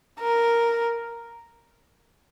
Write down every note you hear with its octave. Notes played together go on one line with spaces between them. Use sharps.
A#4